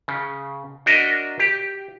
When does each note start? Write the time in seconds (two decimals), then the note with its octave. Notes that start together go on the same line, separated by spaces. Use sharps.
0.08 C#3
0.86 D4 F#4 A#4 D#5 E5
1.39 G4